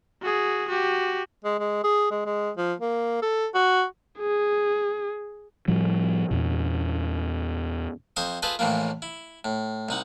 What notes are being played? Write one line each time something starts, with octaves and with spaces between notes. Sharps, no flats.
F#4 G#4
F#4 G4
G#3
G#3
G#4
G#3
G#3
F3
A#3
A4
F#4
G#4
A2 F3 G3
E2 A#2
F2 C5 D#5 C#6 D#6
F4 G#4 A4 B4 C5 D#5
A1 A2 E3 F3 A#3
E4
A2
C2 D#4 F#5